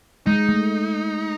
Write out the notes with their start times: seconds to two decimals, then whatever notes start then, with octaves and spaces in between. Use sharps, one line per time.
0.26 G#3 D#4
0.49 A3